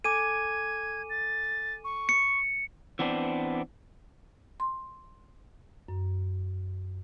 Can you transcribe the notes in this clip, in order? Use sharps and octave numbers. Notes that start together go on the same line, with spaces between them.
A4 G#5 D6 G#6 D#7
A6
C#6
C#7
E3 B3 C4 D4
C6
F#2